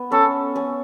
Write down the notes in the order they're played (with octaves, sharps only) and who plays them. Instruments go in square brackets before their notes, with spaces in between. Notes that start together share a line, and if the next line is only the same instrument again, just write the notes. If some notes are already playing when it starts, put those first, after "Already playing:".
Already playing: [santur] B3
[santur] C#4 [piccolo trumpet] A4
[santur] C#4